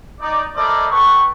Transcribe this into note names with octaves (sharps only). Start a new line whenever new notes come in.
D#4 D5
E4 A4 A#4 C5 D5 D#5
B3 A4 B4 G5 C#6